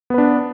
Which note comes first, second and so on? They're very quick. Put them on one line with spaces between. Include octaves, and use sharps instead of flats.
B3 B4 D4